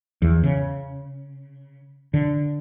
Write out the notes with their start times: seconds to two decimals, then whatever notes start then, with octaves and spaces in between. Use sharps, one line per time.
0.22 E2
0.44 C#3
2.14 D3